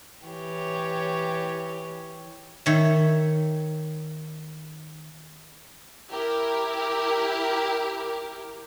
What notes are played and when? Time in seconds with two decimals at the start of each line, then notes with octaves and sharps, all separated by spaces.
0.25 E3 G4 C#5
2.66 D#3 C#5 E5
6.10 E4 G4 A#4